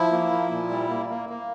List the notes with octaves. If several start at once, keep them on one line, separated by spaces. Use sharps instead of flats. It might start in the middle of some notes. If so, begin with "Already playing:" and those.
Already playing: F3 E4
A#3
F3
A#2
G3
A#3
A#3
A#3